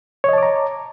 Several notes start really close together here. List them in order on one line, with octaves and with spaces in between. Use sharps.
C#5 D#5 A5 D6 A#5